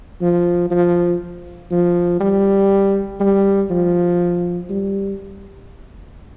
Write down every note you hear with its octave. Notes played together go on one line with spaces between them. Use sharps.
F3
F3
F3
G3
G3
F3
G3